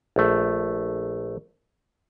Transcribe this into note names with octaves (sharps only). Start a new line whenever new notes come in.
A#1 A3